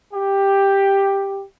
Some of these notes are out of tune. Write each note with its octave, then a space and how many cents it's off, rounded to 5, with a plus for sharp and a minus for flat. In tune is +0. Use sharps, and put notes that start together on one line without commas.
G4 +5